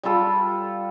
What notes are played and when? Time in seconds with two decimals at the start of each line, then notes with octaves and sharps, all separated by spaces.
0.03 G3 F4 A4